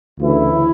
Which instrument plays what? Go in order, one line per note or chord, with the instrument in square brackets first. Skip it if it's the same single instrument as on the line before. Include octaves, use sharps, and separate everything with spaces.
[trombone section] D2 C#3 E3 E4